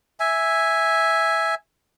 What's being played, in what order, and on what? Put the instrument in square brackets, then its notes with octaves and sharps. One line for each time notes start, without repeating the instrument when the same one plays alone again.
[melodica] E5 G#5